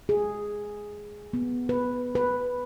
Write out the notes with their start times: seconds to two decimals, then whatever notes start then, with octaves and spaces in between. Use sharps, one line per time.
0.09 G#4
1.33 B3
1.69 B4
2.15 B4